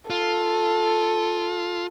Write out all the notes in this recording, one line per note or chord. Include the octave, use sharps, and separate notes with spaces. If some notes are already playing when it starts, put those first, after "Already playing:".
F4 A4